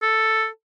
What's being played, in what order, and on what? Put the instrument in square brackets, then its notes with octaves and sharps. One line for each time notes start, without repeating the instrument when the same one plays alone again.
[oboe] A4